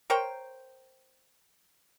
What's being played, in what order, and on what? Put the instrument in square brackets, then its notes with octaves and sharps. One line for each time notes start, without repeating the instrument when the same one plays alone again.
[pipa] A#4 C5 C#5 G5